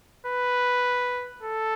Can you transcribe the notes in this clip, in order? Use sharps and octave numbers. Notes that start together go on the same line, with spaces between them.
B4
A4